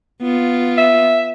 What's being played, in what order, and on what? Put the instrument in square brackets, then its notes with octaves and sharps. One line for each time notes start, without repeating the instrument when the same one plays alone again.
[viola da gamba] B3 F4
[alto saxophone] E5